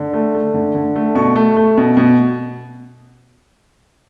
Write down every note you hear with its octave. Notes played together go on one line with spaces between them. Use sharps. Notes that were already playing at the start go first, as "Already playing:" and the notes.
Already playing: D3
A3
A3
D3
D3
A3
B2 C#6
A3
A3
B2
B2